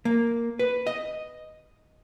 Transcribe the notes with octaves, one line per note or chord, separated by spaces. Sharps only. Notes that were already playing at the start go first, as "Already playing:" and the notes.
A#3
B4
D#5